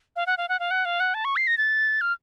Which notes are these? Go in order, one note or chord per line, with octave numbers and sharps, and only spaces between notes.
F5
F#5
F5
F#5
F5
F#5
F5
F#5
A5
C#6
C7
A#6
A6
F6